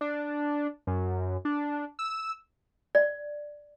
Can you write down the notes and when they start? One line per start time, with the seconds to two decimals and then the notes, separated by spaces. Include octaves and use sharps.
0.01 D4
0.87 F#2
1.45 D4
1.99 E6
2.95 D5